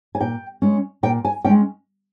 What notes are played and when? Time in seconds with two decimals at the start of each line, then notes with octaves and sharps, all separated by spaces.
0.15 G#5
0.20 A#2 G5
0.62 G#3 C#4
1.03 A#2 G5
1.25 G#5
1.45 G#3 C#4 G5